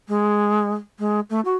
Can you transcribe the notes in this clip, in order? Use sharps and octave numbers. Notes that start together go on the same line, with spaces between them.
G#3
G#3
A3
F#4